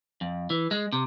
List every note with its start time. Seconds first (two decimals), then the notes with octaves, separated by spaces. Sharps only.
0.21 F2
0.50 E3
0.71 G#3
0.93 C3